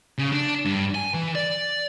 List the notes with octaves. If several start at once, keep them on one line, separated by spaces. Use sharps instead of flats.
C#3
D4
G2
G#5
E3
D5